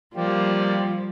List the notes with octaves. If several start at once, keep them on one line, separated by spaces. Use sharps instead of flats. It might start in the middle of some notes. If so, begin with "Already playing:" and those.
F3 G3 A#3 G4 D5